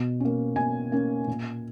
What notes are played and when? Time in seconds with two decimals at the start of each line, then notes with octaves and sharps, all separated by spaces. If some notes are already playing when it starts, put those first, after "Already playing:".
Already playing: B2
0.20 A#3 C#4
0.56 B2 G#5
0.92 A#3 C#4
1.27 A#2